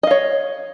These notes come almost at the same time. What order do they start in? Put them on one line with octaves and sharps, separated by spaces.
D#5 F5 C#5